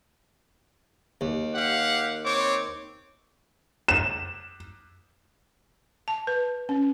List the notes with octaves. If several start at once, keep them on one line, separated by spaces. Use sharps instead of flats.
D#2
G4 F5 F#5
C4 C#5 D6
E7
A5
B4
C#4